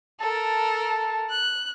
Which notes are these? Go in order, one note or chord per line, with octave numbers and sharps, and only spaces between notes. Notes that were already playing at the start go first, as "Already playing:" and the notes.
A4 A#4 A5
F#6